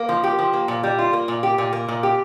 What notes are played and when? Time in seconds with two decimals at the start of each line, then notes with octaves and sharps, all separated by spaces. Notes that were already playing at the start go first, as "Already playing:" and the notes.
Already playing: A#3
0.09 F3
0.23 G4
0.39 F3
0.53 A#3
0.68 A#2
0.83 G3
0.98 F4
1.13 A#3
1.28 A#2
1.43 G4
1.58 A#2
1.73 A#3
1.88 A#2
2.03 G4